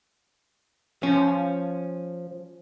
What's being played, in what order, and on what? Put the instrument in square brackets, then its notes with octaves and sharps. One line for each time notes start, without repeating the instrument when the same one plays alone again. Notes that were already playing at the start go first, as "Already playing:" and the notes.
[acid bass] F3 [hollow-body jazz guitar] C#4